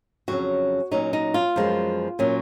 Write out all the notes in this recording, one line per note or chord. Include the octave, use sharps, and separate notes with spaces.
F2 C#3 F#3 C#4 F#4
A#2 F#3 C#4 D#4
D#4
F4
F#2 F3 G#3 B3
A#2 F#3 C#4